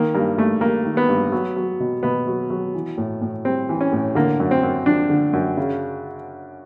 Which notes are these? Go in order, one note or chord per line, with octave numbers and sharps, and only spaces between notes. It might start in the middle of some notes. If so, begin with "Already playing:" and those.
Already playing: D#3 A#3
G2 A#3
G2 A3
G3 A#3
D#3
B3
G2
F#3
F#3
B2
B2 B3
F#3
F#3
E3
A2
A2
G3 C4
E3
C#4
A2
D3 A#3
F#2
C4
F#2
F3 D4
D3
F#2
C#3